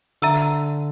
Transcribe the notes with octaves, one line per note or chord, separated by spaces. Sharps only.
D3 E5 A#5 E6